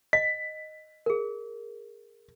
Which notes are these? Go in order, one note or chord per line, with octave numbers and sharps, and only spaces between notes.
D#5 B6
G#4 A#4